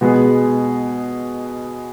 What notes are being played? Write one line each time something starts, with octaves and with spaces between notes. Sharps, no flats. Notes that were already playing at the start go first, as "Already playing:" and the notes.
B2 G#3 B3 G#4